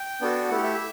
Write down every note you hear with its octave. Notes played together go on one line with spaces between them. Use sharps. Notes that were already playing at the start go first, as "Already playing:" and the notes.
Already playing: G5
B3 D4 F#4 A4
A3 E4 G4 F#5
E5